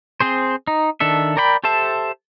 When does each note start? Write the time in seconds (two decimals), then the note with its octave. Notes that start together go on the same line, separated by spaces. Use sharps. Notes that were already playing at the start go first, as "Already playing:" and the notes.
0.20 C4 G#4 C5
0.67 D#4
1.00 D#3 D4 A4 E5
1.37 A#4 D5 G5 B5
1.64 G4 A4 C5 E5 A5